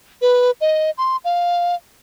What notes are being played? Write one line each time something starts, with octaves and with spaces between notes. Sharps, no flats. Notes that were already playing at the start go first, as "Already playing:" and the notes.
B4
D#5
C6
F5